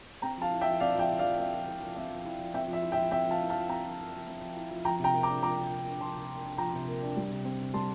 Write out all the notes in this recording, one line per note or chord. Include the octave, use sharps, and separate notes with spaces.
C4 G5 A#5
F3 F5 A5
E4
E5 G5
F3
C4 D5 F5
F3 E5 G5
E4
D5 F5
F3
C4 E5
F3
E4
F3
C4 E5
F3
E4
F3
C4 E5 G5
F3
E5
E4
E5 G5
F3
C4 E5 G5
F3
F5 A5
E4
F5 A5
F3
C4 G5 A#5
F3
E4
F3
C4
F3
E4
F3
F3 G5 A#5
C3 G5 A#5
A#3
A#5 D6
D4
F3 A#5 D6
C3
A#3
D4
F3 A5 C6
C3
A#3
D4
F3 G5 A#5
C3
A#3
D4
G3
C3
C4
C3
G3 A5 C6